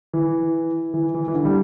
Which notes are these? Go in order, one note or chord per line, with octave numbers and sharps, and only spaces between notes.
E3
E3
E3
E3
D3
G3